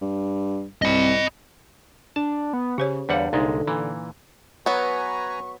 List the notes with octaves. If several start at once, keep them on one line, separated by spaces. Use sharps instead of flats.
G2
C2 D#5 B5
D4 A5
B3
C#3 G4 C5 C#5
E2 D3 G3 C5 C#5 F5 F#5
C2 A#2 G#3 D#4
A#2 E3
F#3 B3 B4 G#5 A#5 C#6